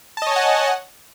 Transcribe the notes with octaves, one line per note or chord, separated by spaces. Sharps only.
C#5 D#5 F#5 G#5 A5